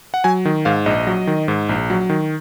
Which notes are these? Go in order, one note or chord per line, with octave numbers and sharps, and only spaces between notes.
F#5
F#3 G#5
D#3
G#2 F5
A#1 D#5
F#3
D#3
G#2
A#1
F#3
D#3